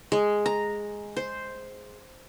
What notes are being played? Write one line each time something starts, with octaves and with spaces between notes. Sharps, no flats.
G#3
A#5
C5